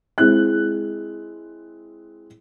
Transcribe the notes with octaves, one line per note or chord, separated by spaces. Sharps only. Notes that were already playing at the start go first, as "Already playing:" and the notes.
G#3 C4 E4 F#6